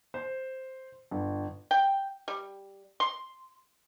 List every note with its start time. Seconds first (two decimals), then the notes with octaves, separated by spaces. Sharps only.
0.14 C5
1.11 G1
1.71 G5
2.28 G3
3.00 C6